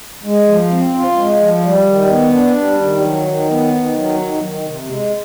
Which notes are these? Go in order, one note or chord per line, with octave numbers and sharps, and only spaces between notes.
G#3
F3
C4
F4
G#3
F3
G3
D#3
B3
D4
G3
D#3
F#3
D#3
B3
D#3
F#3
D#3
D#3
C3
G#3